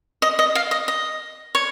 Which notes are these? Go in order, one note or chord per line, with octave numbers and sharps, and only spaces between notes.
D#5
D#5
F5
D#5
D#5
C#5